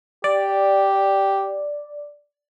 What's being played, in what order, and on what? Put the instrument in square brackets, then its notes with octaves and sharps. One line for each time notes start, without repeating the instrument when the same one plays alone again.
[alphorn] G4 [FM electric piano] D5